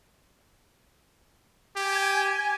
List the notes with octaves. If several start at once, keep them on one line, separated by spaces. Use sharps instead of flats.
G4 G#5